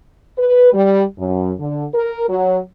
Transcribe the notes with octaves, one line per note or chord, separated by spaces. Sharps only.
B4
G3
F#2
D3
A#4
F#3